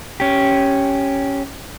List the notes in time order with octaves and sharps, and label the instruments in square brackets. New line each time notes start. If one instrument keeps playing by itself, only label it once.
[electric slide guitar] C#4 G4